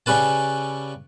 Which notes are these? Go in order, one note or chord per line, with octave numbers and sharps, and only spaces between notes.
C#3 G3 C#4 B4 A5